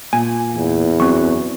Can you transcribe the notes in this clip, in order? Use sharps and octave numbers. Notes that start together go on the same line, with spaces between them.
A#2 G#5
E2
F#2 F#3 C4 C#6